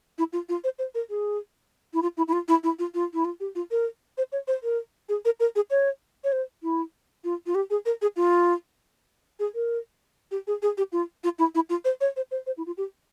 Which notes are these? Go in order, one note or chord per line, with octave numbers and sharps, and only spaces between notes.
E4
F4
F4
C5
C5
A#4
G#4
E4
F4
E4
E4
F4
E4
E4
F4
F4
E4
F4
G4
F4
A#4
C5
C#5
C5
A#4
G#4
A#4
A#4
G#4
C#5
C#5
C5
E4
F4
F4
G4
G#4
A#4
G#4
F4
G#4
A#4
G4
G#4
G#4
G4
F4
F4
E4
E4
F4
C5
C#5
C5
C5
C5
E4
F4
G4